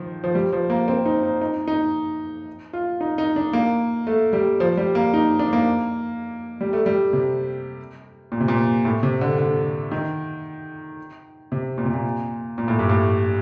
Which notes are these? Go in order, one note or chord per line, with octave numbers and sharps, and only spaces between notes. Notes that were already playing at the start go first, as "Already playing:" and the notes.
Already playing: D#3 F3
F3
G3
F3
A#3
C4
D#4
D#4
D#4
D#4
F4
D#4
D#4
D4
A#3
A3
G3
F3
G3
A#3
D#4
D4
A#3
G3
A3
G3
C3
A#2
C3
A#2
A2
C3
D3
D3
D#3
C3
A#2
C3
A#2
A#2
A2
G2
A2